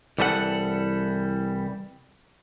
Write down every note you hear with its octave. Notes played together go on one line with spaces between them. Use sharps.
C2 E3 G3 A4 A#4 F#5